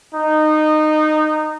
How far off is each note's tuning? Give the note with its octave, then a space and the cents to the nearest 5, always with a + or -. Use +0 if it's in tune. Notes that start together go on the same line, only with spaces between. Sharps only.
D#4 -20